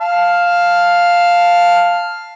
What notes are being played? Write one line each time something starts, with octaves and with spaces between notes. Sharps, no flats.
F5 A5